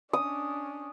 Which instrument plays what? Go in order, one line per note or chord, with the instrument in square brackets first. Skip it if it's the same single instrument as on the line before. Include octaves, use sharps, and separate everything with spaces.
[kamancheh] C#4 D4 [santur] D#6